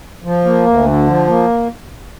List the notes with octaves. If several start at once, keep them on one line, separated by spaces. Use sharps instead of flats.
F3
A#3
D2
D3
F3
A#3